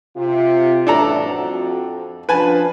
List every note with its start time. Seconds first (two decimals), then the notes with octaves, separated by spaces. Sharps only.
0.16 C3 F4
0.87 A2 E3 D4 A4 A#5
1.25 F2 F#4
2.29 F3 D4 B4 G#5 A5